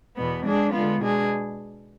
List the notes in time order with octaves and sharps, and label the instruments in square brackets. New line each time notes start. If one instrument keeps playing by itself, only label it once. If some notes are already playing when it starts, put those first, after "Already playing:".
[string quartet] E2 B2 B3
G#3 D4 G#4
D3 G#3 B3 F4
B2 G#3 D4 G#4